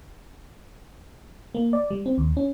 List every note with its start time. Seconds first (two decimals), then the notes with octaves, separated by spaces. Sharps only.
1.55 A#3
1.73 D5
1.90 G3
2.06 C4
2.18 D#2
2.37 C#4